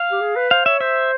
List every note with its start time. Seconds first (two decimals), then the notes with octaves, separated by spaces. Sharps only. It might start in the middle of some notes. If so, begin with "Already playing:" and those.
Already playing: F5
0.11 G4
0.21 G#4
0.36 B4
0.51 C5 F5
0.66 C#5 E5
0.81 C5 E5